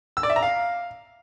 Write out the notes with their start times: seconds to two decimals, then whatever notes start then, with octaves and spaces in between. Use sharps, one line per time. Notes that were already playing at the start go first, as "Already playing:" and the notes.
0.17 E6
0.23 D5
0.30 E5
0.36 A#5
0.43 F5